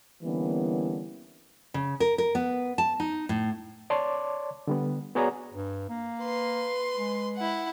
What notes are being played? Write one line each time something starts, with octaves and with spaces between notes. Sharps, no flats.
D3 E3 G3 A#3 B3 C#4
C#3
A#4
A#4
B3
A5
D#4
A2
C#5 D5 A5 C6 D6
D3 G3 B3
B3 F#4 G#4 C#5 D5 A#5
G2
A#3
B4 C6
G#3
E4 F#5